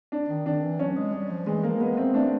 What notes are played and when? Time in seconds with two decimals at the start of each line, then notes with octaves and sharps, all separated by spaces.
0.12 D4
0.29 D#3
0.46 D#3 D4
0.63 E3
0.79 F#3 C#4
0.96 G#3
1.13 G3
1.30 F3
1.46 E3 G#3
1.63 F3 A#3
1.80 G#3 B3
1.97 A3 C4
2.14 A3 D4